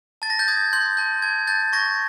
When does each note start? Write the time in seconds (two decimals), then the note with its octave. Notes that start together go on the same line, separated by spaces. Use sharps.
0.22 A5 A6
0.30 A#6
0.39 G6 A6
0.48 D#6 G#6
0.73 C6 G6
0.97 A5 G6
1.22 A5 G#6
1.47 A5 G6 A6
1.73 C#6 G#6 A#6